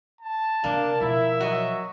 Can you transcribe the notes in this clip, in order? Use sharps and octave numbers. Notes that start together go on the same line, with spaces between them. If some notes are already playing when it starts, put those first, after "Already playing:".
A5
C3 A#3 B3 D4
B2 F3 E4 E5
F#3 F#4 D#5